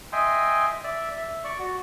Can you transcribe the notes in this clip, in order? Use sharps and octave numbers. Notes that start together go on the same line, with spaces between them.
D#5 E5 G5 G#5 C6
D5 E5
E5
D5 C#6
F#4